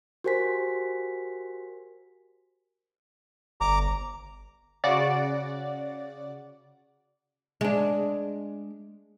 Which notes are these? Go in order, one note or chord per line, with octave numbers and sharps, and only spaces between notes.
F#4 G4 A#4 C5 G#5 B6
G1 A#5 D6
C#3 F#4 D5 F#5 D6 A6
G#3 D4